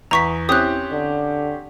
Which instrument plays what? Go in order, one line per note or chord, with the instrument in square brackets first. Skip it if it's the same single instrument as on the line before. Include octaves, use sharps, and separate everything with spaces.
[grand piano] E2 [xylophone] A#5 C#6 B6
[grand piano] C4 C#4 G4 [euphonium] E4 [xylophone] D#6 F#6
[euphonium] D3